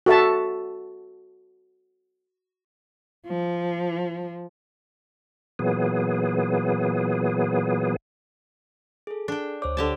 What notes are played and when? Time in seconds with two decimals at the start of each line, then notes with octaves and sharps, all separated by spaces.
0.06 F#4 A4 E5 A5
3.27 F3
5.59 A#2 E3 F#3 B3 G#4
9.07 G#4 A4
9.28 D4 G5
9.62 D2 C5 C#5 D6
9.77 D3 G4 A5